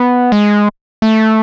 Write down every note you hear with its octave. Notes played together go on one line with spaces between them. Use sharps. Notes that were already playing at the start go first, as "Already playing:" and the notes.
Already playing: B3
G#3
A3